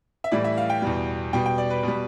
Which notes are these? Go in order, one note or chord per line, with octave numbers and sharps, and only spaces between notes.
E5
A2 E3 G3 D5
E5
F5
G5
E2 B2 G3
B2 G3 G5
G5
D5
B4
B2
G3